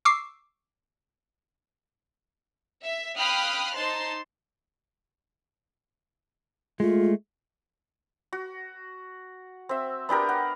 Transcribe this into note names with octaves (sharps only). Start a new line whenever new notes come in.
C#6 D6 E6 C7
E5
F5 G5 B5 D#6 F6 F#6
D#4 C5 A5 C6
G#3 A3 F4
F#4
C4 E5
B3 D4 G4 A#4
F#5